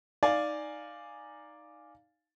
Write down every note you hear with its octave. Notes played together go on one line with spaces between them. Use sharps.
D#4 D5 F5 G#5